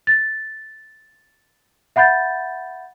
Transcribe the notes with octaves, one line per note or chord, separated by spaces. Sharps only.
A6
E5 F#5 B5 G6 A6